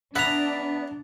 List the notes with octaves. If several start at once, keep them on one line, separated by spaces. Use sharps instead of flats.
B3 D4 E5 F#5 A#5 B5